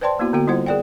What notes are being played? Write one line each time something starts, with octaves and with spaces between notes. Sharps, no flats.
B4 C5 D5 G5 A5 C6
A#3 B3 E4 F#4
D3 A#3 B3 F#4 G5
G3 E4 F4 C5 F#5
G#4 A#4 D5 F#5 G5